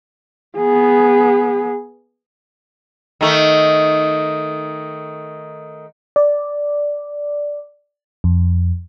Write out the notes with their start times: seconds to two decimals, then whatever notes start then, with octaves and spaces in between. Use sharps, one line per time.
0.57 B3 G#4
3.21 D#3 A3
6.16 D5
8.24 F2